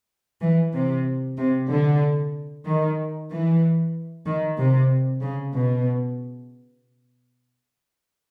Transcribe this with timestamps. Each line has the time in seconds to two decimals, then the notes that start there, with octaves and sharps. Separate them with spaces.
0.42 E3
0.73 C3
1.38 C3
1.70 D3
2.65 D#3
3.30 E3
4.26 D#3
4.58 C3
5.22 C#3
5.53 B2